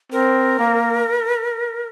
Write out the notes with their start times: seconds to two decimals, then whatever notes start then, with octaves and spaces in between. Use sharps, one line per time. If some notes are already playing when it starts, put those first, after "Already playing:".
0.12 C4 A#4
0.59 A#3